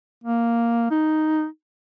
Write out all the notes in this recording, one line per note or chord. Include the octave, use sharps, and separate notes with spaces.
A#3
D#4